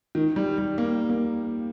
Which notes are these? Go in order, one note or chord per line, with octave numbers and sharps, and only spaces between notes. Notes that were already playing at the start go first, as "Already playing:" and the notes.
D#3
G3
G3
A#3
A#3